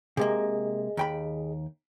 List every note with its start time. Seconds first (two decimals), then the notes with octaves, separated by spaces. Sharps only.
0.17 C3 G#3 A#3 G#4 D#5
0.97 D#2 G5 B5